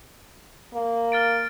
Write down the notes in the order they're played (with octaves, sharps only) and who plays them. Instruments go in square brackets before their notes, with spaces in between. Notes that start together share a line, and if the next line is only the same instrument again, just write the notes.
[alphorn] A#3
[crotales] F6 A6 D7